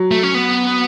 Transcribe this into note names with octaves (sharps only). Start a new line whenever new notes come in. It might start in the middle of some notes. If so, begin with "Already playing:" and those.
Already playing: F#3
A3
C#4
B3